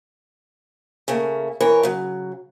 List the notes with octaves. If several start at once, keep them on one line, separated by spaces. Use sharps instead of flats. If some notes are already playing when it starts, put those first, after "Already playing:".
C#3 A3 A#3
E3 A#4 C#5
C#3 F#3